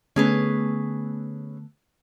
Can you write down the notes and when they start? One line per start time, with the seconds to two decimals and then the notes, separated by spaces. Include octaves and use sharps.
0.16 D3 A3 B3 C#4 G#4 B4